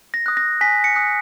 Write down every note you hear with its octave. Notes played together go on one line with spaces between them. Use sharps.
A#6
D#6 F#6
A#6
G#5 B6
C#7
D#6 F#6